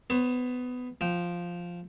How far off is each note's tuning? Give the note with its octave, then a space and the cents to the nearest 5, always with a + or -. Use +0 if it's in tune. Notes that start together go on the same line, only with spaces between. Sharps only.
B3 +15 C5 +45
F3 +0 G5 -10